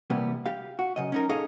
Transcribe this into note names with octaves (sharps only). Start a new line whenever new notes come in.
C3 E3 G3 A#3 B3
G4 F5
F#4
F#2 C#3 D#5
C#4 D#4 A#4
D#4 G#4 A4 C#5 D#5 F5